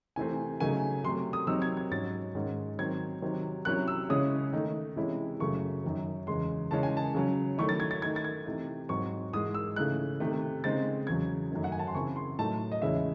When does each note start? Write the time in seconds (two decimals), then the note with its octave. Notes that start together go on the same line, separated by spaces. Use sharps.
0.16 C3 E3 A3 C4 G#5
0.60 C#3 F#3 A3 D#4 G#5
1.04 C3 F#3 A3 C6
1.33 D#6
1.47 C3 F#3 C4 D#4 E6
1.62 G#6
1.77 G#6
1.91 G#2 F#3 C#4 A6
2.35 G#2 D#3 G#3 C#4
2.79 D#3 F#3 C4 G#6
3.22 C3 D#3 F#3 C4
3.65 C3 F#3 C#4 E4 F#6
3.88 E6
4.09 C#3 G#3 C#4 E4 D#6
4.52 D#3 A3 D#4
4.96 C3 E3 G#3 C#4 E4
5.40 F#2 C#3 F#3 A3 C#6
5.84 F#2 D#3 F#3
6.27 E2 C#3 G#3 C6
6.71 C#3 E3 G#3 C#4 A5
6.83 G#5
6.97 A5
7.15 C#3 F#3 C#4
7.58 D#3 F#3 A3 C#4 E4 C#6
7.69 A6
7.80 G#6
7.91 A6
8.02 D#3 A3 D#4 G#6
8.16 A6
8.24 G#6
8.46 C3 E3 A3 D#4
8.89 G#2 F#3 C4 C#6
9.33 G#2 E3 G#3 D#6
9.54 E6
9.76 C#3 E3 A3 D#4 F#6
10.20 C3 D#3 A3
10.64 C#3 G#3 C4 D#4 A6
11.07 E2 C#3 F#3 G#6
11.51 F#2 D#3 A3 C#4
11.64 F#5
11.72 G#5
11.79 A5
11.87 C6
11.95 C#3 E3 C4 E4 C#6
12.16 C6
12.39 A2 F#3 A3 D#4 A5
12.72 D#5
12.82 E2 C#3 G#3 C#4 E4 E5